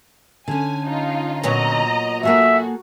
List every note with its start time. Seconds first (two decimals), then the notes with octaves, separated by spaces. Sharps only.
0.48 D3 C#4 G#5
0.86 D#4 F4
1.44 A#2 F#3 B3 D#5 A#5
2.23 A#3 F#4 G#4 A4 E5